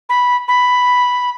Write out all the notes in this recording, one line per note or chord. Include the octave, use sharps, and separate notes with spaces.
B5
B5